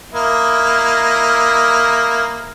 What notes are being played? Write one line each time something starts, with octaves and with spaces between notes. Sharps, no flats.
A#3 E4 D#5